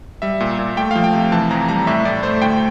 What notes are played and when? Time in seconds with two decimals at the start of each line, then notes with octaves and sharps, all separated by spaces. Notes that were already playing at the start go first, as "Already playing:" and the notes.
0.22 G3 E5
0.40 A#2
0.59 A#2
0.76 A3 G5
0.91 F3 F5
1.04 G5
1.13 C3
1.32 E3 A5
1.51 F2 A#5
1.69 G3 A#5
1.87 A2 E5
2.05 A2 D5
2.23 A3 C5
2.42 D2 G5